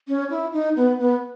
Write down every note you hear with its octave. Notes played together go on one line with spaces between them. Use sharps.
C#4
E4
D#4
B3
B3